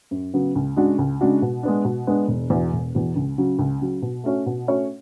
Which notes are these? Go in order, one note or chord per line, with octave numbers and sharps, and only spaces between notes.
F#2
C#3 F#3 B3
C#2
C#3 G#3 D4 F#4
C#2
C#3 G#3 D4 F#4
B2
G#3 B3 D4
B2
G#3 B3 D4
E1
E2 B2
E1
E2 B2
C#2
C#3 F#3
C#2
C#3 F#3
B2
A3 C#4 F#4 C#5
B2
A3 C#4 F#4 C#5